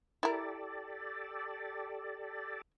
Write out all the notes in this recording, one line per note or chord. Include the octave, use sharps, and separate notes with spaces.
E4 G4 A4 A#4 D5